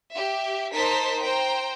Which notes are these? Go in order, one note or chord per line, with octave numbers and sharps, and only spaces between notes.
G4 E5
D#4 A#4 C5 A5 A#5 B6
C5 G5 A#5